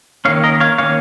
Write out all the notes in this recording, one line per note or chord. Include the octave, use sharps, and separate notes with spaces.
D#3 A#3 C#4 C#5 F5
A#4 D#5
C#5 F5
D#3 A#3 C#4 C#5 F5